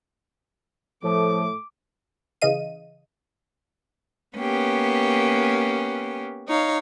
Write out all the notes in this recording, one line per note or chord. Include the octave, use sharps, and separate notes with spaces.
A2 F3 A3 D6
C#3 E3 G#4 D#5 F5 D#7
A#3 B3 C#4 G4
D#4 C#5 F5